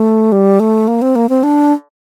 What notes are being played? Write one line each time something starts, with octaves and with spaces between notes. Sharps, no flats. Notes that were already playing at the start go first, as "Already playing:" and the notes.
Already playing: A3
G3
A3
A#3
C4
A#3
C4
D4